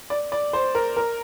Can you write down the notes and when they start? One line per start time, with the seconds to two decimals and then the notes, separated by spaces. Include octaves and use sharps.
0.10 D5
0.32 D5
0.53 C5
0.75 A#4
0.97 A#4